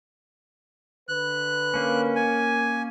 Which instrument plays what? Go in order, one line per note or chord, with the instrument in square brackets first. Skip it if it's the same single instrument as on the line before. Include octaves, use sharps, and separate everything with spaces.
[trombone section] D3 B4 [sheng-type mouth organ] F#6
[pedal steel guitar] A#3 C#4
[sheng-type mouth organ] G#5